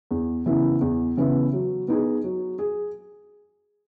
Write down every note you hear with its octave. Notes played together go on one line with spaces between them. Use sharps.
E2
C#3 E3 B3 E4
E2
C#3 E3 B3 E4
F#3
B3 D#4 G#4
F#3
G#4